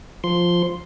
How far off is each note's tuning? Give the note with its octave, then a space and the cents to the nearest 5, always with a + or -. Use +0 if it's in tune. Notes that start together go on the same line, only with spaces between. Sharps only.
F3 +0 C6 +0